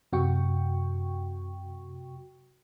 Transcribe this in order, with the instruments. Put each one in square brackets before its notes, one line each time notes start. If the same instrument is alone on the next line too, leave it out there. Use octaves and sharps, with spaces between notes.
[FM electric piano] F#2 C3 F#4 G5 C#6